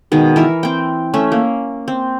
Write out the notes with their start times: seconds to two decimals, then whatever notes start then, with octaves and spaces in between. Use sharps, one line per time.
0.12 B2 D#3 G#3
0.36 E3 A#4 E5
0.63 C4 G5
1.14 A3 C#4 E5
1.32 A#3
1.88 C4